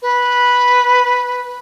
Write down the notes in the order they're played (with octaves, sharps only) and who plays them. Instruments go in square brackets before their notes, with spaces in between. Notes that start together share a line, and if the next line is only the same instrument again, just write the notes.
[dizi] B4